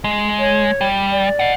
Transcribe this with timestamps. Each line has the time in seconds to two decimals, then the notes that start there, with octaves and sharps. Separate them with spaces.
0.04 G#3
0.39 C#5
0.81 G3
1.12 D5
1.40 D#5 F#5